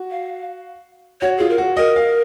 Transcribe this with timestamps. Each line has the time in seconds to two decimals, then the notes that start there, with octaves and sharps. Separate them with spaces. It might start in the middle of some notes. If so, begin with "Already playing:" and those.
Already playing: F#4
0.11 F5
1.21 F#4 C#5
1.38 F4 G#4
1.50 A#4
1.58 F#4
1.77 A#4 D#5
1.96 F5